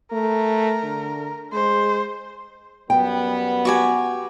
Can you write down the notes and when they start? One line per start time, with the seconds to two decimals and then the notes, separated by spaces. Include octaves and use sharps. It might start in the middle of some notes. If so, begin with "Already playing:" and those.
0.12 A3 A#4
0.83 D3
1.53 G#3 C5
2.90 F#2 G3 B3 G5
3.65 F#4 G4 G#5